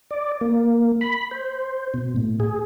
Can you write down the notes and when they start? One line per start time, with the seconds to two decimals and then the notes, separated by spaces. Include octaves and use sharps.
0.11 D5
0.41 A#3
1.01 B5
1.31 C5
1.94 B2
2.16 A2
2.40 G#4